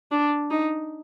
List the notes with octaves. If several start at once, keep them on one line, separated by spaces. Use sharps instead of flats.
D4
D#4